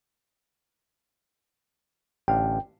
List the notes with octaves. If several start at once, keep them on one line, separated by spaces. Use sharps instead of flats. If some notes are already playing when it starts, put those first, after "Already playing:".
A1 D3 F5 G5